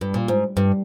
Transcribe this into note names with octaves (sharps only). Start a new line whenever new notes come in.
G2
A#2
G#2
G2